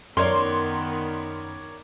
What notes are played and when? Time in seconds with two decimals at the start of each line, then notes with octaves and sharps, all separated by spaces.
0.17 F#2 D#3 B3 A#4 C#5 D5 C6